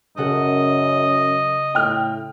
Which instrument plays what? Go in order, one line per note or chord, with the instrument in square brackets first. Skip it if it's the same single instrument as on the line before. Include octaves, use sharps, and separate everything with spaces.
[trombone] F#2 [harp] C#3 A4 F#5 [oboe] D#5
[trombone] A2 [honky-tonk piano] G5 F6